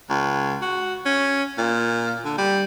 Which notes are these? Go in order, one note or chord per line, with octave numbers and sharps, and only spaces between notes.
C#2
F#4
C#4
A#2
D3
G3